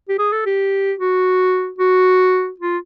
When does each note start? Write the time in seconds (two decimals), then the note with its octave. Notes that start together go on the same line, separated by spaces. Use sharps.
0.09 G4
0.19 G#4
0.32 A4
0.46 G4
0.99 F#4
1.79 F#4
2.60 F4